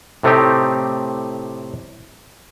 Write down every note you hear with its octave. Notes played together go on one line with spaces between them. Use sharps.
A2 C3 A3 C4 D#4 G4